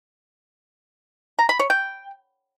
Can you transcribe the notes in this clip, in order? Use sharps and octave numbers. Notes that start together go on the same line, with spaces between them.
A#5
B5
C#5
G5